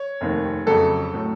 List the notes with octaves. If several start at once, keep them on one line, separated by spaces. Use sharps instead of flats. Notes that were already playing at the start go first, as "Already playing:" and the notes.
Already playing: C#5
F1 D#2 D#3
F2 C#3 F#3 A4
A2 F#3